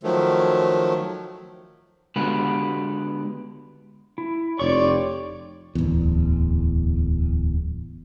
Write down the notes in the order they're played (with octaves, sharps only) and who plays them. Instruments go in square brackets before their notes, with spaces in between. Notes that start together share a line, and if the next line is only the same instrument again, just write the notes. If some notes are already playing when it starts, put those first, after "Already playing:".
[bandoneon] D#3 F3 F#3 A3
[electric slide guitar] D3 G#3 B3 F#4 G4 B4
[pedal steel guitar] E4
[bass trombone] F1 [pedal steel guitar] F4 G4 C#6 [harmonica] C#5 D5
[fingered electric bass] D1 E2